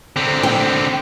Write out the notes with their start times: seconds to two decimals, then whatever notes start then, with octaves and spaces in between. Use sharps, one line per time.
0.16 D3 C4
0.43 G5